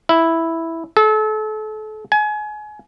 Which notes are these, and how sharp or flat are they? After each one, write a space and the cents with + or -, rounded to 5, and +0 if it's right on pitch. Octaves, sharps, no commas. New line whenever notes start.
E4 -5
A4 -35
G#5 +30